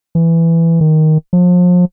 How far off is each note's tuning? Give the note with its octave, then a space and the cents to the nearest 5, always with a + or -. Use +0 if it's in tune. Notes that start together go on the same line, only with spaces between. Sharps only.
E3 +10
D#3 +5
F3 +35